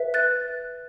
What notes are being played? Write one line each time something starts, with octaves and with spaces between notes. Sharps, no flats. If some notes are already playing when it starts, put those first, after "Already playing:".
Already playing: B4 E5
F#6 A6